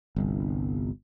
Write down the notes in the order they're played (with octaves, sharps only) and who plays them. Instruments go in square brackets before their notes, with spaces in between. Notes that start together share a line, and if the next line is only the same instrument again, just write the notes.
[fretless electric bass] G1 C2